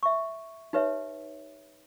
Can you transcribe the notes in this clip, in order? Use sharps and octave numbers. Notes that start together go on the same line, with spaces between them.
E5 C#6
D#4 G4 B4 C#5 E5